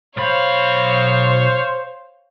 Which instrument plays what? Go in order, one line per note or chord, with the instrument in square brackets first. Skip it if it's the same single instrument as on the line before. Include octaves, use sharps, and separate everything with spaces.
[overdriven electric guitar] B1 B5 [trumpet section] C5 [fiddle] C#5 F5